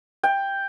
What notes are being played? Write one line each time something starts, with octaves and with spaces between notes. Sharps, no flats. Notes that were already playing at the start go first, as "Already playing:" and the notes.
G5